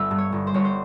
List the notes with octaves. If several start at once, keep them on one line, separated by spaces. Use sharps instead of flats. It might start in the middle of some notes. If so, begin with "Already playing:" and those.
Already playing: G1 E5
G2
C#5
G1
C5
G1 C#5
C5